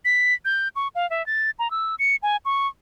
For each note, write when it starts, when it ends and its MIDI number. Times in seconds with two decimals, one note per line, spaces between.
0.05 0.34 95
0.45 0.68 91
0.76 0.88 85
0.95 1.09 77
1.10 1.25 76
1.26 1.50 93
1.59 1.70 82
1.71 1.95 88
1.99 2.16 97
2.23 2.37 80
2.45 2.68 85